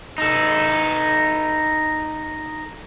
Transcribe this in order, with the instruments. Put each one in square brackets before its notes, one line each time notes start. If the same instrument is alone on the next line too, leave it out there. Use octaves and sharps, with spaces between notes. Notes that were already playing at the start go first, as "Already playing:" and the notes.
[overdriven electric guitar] D#4 A4